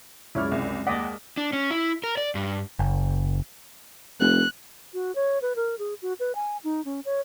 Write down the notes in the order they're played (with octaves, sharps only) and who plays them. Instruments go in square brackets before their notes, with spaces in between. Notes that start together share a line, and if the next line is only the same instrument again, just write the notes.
[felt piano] C#2 F#2 F6 [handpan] G#3 [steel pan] E4 C#5 D5
[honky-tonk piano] C2
[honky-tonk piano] D#2 F#5 [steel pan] D5 D#5 [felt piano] B6
[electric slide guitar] D4
C#4
E4
A#4
D5
G2
[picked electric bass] F#1
[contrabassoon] F1 [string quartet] F#6
[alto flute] F#4
C#5
B4
A#4
G#4
F#4
B4
G#5
D#4
C#4
C#5